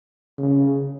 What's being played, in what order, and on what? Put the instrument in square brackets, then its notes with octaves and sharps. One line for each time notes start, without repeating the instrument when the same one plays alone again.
[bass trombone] C#3